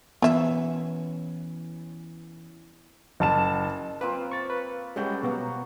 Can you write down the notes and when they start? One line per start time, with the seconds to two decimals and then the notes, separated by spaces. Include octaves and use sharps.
0.22 E3 B3 C#4 F4 C#5 E5
3.20 F#1 A5 E7
4.01 A#3 C4 F4 B4
4.31 C#6 A6
4.50 B4
4.96 G3 G#3 C#4 F#4 A4 G6
5.23 B2 F#3 A#3 B3